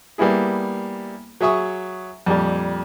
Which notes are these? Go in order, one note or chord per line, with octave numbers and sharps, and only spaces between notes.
G3 A#3 B3 E4 G#4
F#3 G#4 E5 C#6 D#6
F2 A#2 G3